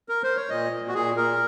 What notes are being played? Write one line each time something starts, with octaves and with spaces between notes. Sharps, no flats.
A#4
C5
C#5
A#2 D#5
A#2
F#4
A#2 G#4
A#2 A#4